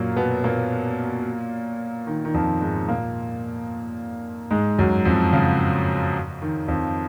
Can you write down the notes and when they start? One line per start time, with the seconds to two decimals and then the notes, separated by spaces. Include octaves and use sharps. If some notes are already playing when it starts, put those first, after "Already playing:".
Already playing: F#2 A#2 F#3 A#3
0.16 B2 B3
0.44 A#2 A#3
2.07 D#3
2.25 D#3
2.34 F2 F3
2.61 G#2 G#3
2.88 A#2 A#3
4.51 G#2 G#3
4.78 F#2 F#3
5.05 F2 F3
5.33 C#3
6.42 D#3
6.68 F2 F3